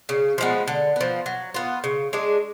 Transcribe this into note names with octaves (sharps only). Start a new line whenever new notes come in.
C#3
F3 G#3 B3
D3
F3 B3
F#3
B3 F4
C#3
G#3 D4 G#4